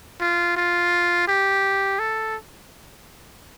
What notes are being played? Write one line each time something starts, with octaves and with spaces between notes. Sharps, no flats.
F4
F4
G4
A4